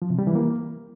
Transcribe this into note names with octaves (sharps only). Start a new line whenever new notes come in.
F3
C3
G3
E3
A#3